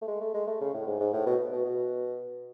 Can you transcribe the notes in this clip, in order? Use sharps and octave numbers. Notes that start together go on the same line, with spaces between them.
A3
G#3
A3
G#3
A3
C#3
A2
G#2
G#2
A2
B2
B2
B2